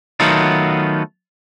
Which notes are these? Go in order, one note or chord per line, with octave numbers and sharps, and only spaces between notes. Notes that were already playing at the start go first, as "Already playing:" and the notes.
D#3 F#3 A3 B3 D#4 F4